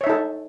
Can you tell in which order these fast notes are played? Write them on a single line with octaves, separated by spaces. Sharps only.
C#5 E5 D#4 A4